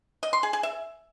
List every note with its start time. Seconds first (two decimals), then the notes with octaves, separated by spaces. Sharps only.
0.23 D#5
0.33 C6
0.43 G#4
0.53 G#4
0.63 E5